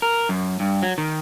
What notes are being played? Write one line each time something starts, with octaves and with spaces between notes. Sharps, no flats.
A#4
F#2
G2
F#3
D#3